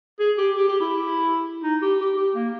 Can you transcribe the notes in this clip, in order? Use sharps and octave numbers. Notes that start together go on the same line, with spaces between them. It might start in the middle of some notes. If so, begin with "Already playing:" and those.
G#4
G4
G4
G4
E4
D#4
G4
G4
G4
A#3